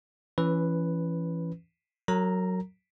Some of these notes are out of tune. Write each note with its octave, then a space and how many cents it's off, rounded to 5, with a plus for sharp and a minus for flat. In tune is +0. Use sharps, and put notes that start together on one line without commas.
E3 +25 C#4 +0 B4 +0
F#3 +0 A#4 -35 A#5 +0